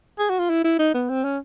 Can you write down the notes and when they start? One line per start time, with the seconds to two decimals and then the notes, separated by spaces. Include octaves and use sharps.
0.19 G#4
0.30 F#4
0.39 F4
0.50 E4
0.64 E4
0.79 D#4
0.95 B3
1.09 C4
1.24 C#4